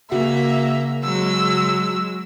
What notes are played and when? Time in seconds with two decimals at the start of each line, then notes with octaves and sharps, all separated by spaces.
0.11 C#3 A#3 F#4 E5 F#5
1.04 F#3 G#3 E6